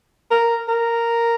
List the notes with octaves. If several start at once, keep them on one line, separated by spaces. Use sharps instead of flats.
A#4
A#4